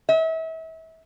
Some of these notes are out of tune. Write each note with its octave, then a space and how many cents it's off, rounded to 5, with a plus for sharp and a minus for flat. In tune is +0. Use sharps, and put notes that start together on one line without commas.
E5 -35